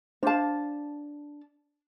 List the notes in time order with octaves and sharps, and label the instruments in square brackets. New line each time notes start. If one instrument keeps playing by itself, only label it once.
[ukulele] D4 A5 [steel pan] C5 F5